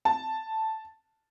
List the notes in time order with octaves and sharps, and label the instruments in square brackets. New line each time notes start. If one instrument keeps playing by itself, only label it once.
[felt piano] A5